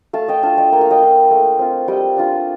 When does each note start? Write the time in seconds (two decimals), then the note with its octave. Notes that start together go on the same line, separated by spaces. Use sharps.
0.13 A3 F5 A5
0.28 D#5 G5
0.43 D4 F4 F5 A5
0.57 D#5 G5
0.72 A#3 G5
0.81 F5
0.91 D#5 G5
1.01 D4 F4
1.31 A3
1.59 C4 F4
1.88 G3 D#5 G5
2.17 D4 F4